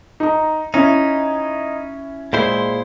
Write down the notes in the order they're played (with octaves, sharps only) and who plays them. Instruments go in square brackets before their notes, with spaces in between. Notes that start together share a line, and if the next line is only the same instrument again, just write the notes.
[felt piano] D#4 A#5
[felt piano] C#4 E4 [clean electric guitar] D#4
[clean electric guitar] A#2 E4 C5 [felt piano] G#3